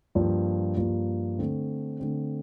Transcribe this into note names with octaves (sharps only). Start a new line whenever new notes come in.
G2 F3 A#3
G2 F3 A#3
D3 A3 C4
D3 A3 C4